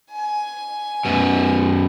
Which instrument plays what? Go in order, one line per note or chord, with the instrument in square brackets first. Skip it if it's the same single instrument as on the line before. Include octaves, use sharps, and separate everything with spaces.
[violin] G#5
[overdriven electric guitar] F#2 B2